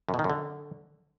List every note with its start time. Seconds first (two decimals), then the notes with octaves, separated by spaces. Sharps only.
0.09 F#2
0.14 B2
0.19 D#3
0.24 F#2
0.30 D3